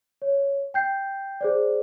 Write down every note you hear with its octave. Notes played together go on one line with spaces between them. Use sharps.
C#5
G5 G6 C7
G#4 C5 D5